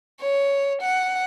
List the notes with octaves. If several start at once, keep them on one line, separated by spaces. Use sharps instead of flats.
C#5
F#5